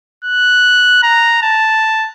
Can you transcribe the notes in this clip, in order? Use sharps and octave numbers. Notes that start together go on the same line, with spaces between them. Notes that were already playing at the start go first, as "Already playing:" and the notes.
F#6
A#5
A5